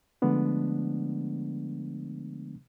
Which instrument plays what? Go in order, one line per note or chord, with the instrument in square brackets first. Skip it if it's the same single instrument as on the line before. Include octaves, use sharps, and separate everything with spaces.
[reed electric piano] D3 F3 G#3 A3 B3 D4